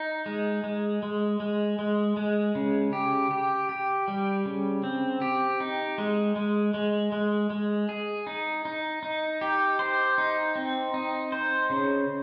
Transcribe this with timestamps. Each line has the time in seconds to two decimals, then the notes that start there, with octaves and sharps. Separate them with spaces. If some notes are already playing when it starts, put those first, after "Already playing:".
Already playing: D#4
0.26 G#3
0.64 G#3
1.03 G#3
1.40 G#3
1.79 G#3
2.17 G#3
2.55 C#3
2.93 G4
3.31 G4
3.69 G4
4.08 G3
4.45 C#3
4.84 C4
5.22 G4
5.60 D#4
5.98 G#3
6.36 G#3
6.74 G#3
7.12 G#3
7.50 G#3
7.89 G#4
8.27 D#4
8.65 D#4
9.03 D#4
9.41 G4
9.79 C5
10.18 D#4
10.56 C4
10.94 D#4
11.32 C5
11.70 C#3